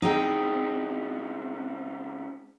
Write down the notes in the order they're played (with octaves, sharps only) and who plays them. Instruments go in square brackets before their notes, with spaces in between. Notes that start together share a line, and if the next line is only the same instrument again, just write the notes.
[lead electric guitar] C#2 C4 [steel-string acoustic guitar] D#4 G#4 G5